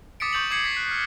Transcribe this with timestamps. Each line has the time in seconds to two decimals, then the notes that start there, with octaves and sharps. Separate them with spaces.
0.20 D6 D#6 A6 B6 C#7 D7
0.33 C#6 D#6 G6 A6 F7 F#7
0.50 D6 D#6 G#6 C7 C#7 F#7
0.64 A6 B6
0.77 F#6
0.91 F6